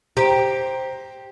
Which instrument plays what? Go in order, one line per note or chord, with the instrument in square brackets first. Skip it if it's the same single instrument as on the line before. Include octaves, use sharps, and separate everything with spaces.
[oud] G4 [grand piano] C5 A#5